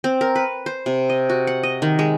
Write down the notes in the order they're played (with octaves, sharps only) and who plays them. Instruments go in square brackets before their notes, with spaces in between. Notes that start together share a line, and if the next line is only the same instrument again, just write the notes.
[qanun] C4
A#4
B4
C5
C3
D#5
F#4
F#5
D#5
D#3
G#3